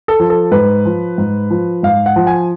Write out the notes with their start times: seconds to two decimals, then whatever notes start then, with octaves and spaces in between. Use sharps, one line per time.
0.08 A4
0.20 F3
0.30 A4
0.52 G#2 B4
0.86 F3
1.18 G#2
1.51 F3
1.83 G#2 F5
2.06 F#5
2.16 F3
2.27 G#5